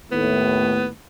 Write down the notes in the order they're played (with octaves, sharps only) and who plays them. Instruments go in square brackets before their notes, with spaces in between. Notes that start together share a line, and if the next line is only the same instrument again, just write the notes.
[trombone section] D#2 A2 [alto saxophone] B3